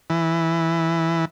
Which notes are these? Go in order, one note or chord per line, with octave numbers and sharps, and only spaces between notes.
E3